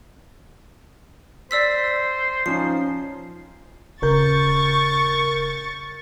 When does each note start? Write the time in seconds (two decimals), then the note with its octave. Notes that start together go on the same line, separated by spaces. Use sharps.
1.51 C5 D5 E6 B6
2.46 F3 C#4 D#4 C7
4.02 D#1 C#3 A#4 C#6 G6 A6